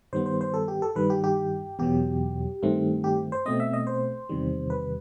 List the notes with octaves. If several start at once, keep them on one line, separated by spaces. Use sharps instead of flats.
G2 D#3 G3 B3 C5
C5
C5
A4
G4
A4
G2 D#3 G3 B4
G4
G4
E2 B2 F#3 G4
G2 D#3 A3 C4
G4
C5
B2 A3 C4 D#5
E5
D#5
C5
E2 C3 D#3 G3
B4